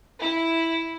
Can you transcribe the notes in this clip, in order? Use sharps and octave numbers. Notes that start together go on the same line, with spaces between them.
E4